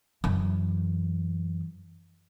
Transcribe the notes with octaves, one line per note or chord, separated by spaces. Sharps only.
F#2 E3